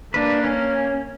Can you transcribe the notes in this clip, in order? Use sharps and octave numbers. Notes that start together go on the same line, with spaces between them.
A#3 D4 B4
C#4